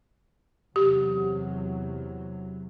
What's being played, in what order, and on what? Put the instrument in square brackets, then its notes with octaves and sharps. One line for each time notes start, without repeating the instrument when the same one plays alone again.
[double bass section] E2 C3 F#3 [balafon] G4